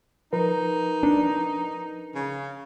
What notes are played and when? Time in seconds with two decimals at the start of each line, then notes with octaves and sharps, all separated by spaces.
0.33 F3 D#4 A#4 B4
1.03 D4
2.15 C#3